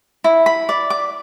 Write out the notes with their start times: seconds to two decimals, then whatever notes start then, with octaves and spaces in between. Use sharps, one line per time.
0.24 E4
0.46 B5
0.69 D5
0.90 D6